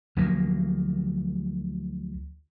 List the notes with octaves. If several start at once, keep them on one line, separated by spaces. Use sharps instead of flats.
D2 F3 F#3 A#3